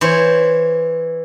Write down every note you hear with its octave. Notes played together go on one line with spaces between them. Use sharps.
E3 C5 C#5